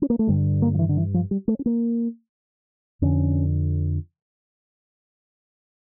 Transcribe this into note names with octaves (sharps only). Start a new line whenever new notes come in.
C#4
A#3
A3
G2 D3 G3
A#3
F3
E3
D3
E3
F3
G3
A3
C#4
A#3
F2 D3 C#4